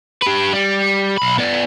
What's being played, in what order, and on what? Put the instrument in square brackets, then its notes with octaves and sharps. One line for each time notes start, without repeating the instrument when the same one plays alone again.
[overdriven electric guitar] G4 B4
G3
B1 B5
B3 D5